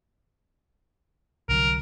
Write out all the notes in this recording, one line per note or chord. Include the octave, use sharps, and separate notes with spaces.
C2 D3 F#3 A#4